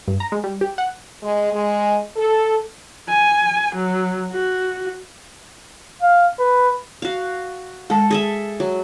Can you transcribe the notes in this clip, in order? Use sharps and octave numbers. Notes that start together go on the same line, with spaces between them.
G2
A#5
G#3
G3
G4
F#5
G#3
G#3
A4
G#5
F#3
F#4
F5
B4
F#4 F5
G#3 A4 A5
G#4 A4 E5
F#3